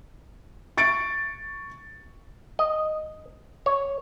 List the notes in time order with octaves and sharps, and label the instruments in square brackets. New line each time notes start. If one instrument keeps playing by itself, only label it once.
[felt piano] C#6 A6 C#7 D7
[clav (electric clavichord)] D#5
C#5